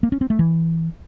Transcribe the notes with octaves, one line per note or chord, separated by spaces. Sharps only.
A#3
C#4
C4
A3
E3